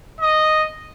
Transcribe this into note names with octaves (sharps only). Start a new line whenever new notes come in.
D#5